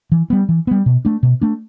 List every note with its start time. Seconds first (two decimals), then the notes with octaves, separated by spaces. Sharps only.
0.12 E3
0.30 G3 B3
0.49 E3
0.67 G3 B3
0.86 B2
1.05 A3 D4
1.23 B2
1.42 A3 D4